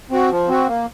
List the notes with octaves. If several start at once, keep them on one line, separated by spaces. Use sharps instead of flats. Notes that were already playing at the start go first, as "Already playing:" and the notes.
C4 F#4
F3
C4 F#4
A#3